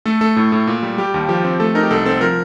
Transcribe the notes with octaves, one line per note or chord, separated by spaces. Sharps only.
A3 A4
A3 A4
A2
A2
A#2
G3
G3 G4
D#2
F3 G4
C4
A3 A4
D#4 A#4
G4
C2 A4
C4 A4
F3 A#4